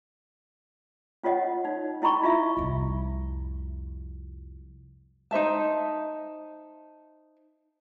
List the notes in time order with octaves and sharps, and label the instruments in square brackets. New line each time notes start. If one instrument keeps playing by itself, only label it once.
[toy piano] C#4 F4 C#5 D#5 F#5
D#4 C#5
C#4 E4 D#5 B5 C#6
D#4 F4 D#5 E5
[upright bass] C2 F2
[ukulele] D#4 C5 E5 A5